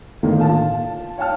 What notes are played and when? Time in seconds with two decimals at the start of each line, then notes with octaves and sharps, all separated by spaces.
0.23 A2 D3 D#3 A#3
0.39 F4 A5
1.18 C#5 F5 G5 A5 F6